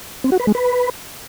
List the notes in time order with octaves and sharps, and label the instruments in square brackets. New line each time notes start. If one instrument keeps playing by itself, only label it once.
[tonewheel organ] C4
F#4
B4
G#3
B4